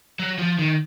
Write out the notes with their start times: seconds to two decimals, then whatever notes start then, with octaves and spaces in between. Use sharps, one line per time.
0.19 F#3
0.39 F3
0.59 D#3